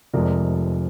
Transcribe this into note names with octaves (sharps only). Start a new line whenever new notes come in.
F1 F2 C3 F3 G#3 A#4 D5